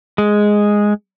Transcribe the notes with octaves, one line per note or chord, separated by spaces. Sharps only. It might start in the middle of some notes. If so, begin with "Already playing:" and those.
G#3